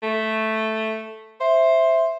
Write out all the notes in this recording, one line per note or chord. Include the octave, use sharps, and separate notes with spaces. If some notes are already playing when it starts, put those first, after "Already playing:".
A3
C5 E5